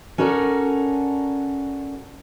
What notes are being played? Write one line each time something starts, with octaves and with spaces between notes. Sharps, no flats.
C#4 F#4 A4 A#4 D5